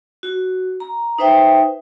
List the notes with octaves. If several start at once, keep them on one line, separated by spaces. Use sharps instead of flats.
F#4
A#5
D#4 B4 C5 E5 G5